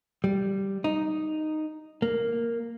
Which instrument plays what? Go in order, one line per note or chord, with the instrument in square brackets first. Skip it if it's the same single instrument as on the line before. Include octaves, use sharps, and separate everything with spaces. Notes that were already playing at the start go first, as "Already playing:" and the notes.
[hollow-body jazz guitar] G3
D#4
A#3